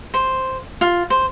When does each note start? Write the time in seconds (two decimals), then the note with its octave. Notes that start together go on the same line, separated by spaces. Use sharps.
0.14 C5
0.81 F4
1.10 C5